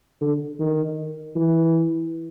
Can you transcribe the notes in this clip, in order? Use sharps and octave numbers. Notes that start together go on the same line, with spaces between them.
D3
D#3
E3